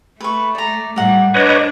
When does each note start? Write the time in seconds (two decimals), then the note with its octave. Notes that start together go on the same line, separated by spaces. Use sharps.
0.20 A3 B4 C#6
0.55 D5 A#5
0.96 A2 G3 A#4 F#5
1.34 D4 B4 C#5 D#5